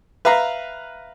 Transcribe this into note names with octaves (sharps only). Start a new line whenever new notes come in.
B4 E5 F5 A#5